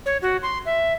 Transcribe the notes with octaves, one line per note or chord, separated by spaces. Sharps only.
C#5
F#4
C6
E5